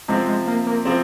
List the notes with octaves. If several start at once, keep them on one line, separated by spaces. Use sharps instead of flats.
C3 F3 G#3 C4
G#3
A#3
A#3
C3 F3 C4